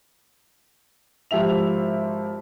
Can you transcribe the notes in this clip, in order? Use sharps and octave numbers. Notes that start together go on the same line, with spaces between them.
G#1 F3 G4 E5 F7